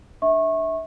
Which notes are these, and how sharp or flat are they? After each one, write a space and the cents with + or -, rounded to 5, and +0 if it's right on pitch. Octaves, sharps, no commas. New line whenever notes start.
D4 +10 E5 -20 C#6 -25